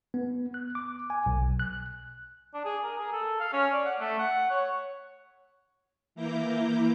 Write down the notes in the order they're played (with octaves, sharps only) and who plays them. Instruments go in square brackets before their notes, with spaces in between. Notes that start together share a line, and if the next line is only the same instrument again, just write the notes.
[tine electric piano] B3
F#6
D6
G#5
B1
F#6
[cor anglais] D4
G#4
A#4
G#4
A4
F5
C#4
D5
F#5
A3
F#5
C#5
[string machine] E3 A#3 E4 A#5 D6 G6